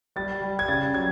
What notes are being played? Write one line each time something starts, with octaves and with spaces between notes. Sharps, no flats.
G3 A6
G3
G#6
C#3 A6
F#3 G#6